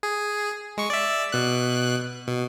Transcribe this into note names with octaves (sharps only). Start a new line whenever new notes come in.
G#4
G#3 C#6
D5 E5
B2 F#6
B2